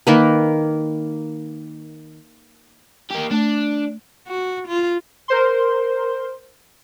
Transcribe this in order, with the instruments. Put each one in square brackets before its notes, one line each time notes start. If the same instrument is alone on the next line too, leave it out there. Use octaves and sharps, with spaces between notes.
[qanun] D#3 A#3 B4
[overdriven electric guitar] A#3 G4
[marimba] A3 [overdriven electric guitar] D4
[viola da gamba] F#4
F4
[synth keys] A#4 C5 C6